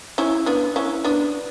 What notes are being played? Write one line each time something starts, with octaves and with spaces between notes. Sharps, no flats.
C#4 E4
B3 D4
C#4 E4
B3 D4